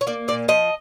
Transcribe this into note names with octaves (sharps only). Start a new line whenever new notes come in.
C#5
A#3 D5
A#2 D5
F3 D#5